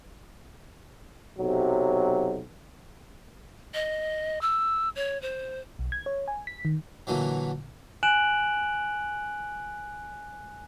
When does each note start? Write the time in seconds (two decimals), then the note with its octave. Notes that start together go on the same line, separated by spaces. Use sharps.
1.38 B1 C3 F#3
3.74 D#5
4.41 E6
4.96 C#5
5.22 C5
5.79 B1
5.92 G#6
6.06 C#5
6.28 G#5
6.47 B6
6.65 D#3
7.07 A#2 D3 E3 F#3
8.03 G#5 F#6 D7 E7 F#7